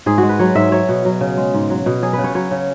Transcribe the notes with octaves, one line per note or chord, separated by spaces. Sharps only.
G#2 G#4
F#4
G#3
B4
F#3 C#5
G#2 E5
F#3 C#5
B2
F#3
C#3
G#3
G#2
F#3
B2
F#3 G#4
C#3 B4
C#5
F#3 C#5
C#3